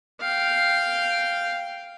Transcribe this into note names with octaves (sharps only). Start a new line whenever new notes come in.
F5 G5